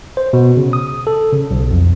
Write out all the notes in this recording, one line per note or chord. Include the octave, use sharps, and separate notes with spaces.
C5
B2
C#3
D#6
A4
C#3
B1
F2